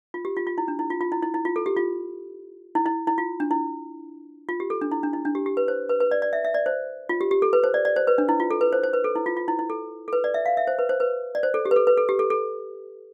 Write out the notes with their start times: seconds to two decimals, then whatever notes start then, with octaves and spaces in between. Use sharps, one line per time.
0.14 F4
0.25 G4
0.36 F4
0.47 F4
0.58 E4
0.68 D4
0.79 E4
0.90 F4
1.01 F4
1.12 E4
1.23 E4
1.34 E4
1.45 F4
1.56 A4
1.66 G4
1.77 F4
2.75 E4
2.86 E4
3.07 E4
3.18 F4
3.40 D4
3.51 E4
4.49 F4
4.60 G4
4.70 A4
4.81 D4
4.91 E4
5.03 D4
5.13 E4
5.25 D4
5.35 G4
5.46 G4
5.57 B4
5.68 C5
5.89 B4
6.00 B4
6.11 D5
6.22 D5
6.33 E5
6.45 E5
6.54 D5
6.66 C5
7.09 F4
7.21 G4
7.31 G4
7.42 A4
7.53 B4
7.64 C5
7.74 D5
7.85 D5
7.96 C5
8.07 B4
8.18 D4
8.29 E4
8.40 F4
8.51 A4
8.61 B4
8.73 C5
8.84 C5
8.93 B4
9.04 A4
9.15 E4
9.26 F4
9.37 F4
9.48 E4
9.59 E4
9.70 A4
10.08 A4
10.13 B4
10.24 D5
10.34 E5
10.46 F5
10.57 E5
10.67 C5
10.79 B4
10.89 C5
11.00 B4
11.35 D5
11.43 C5
11.54 A4
11.65 G4
11.71 B4
11.76 A4
11.87 B4
11.97 A4
12.09 G4
12.19 A4
12.30 A4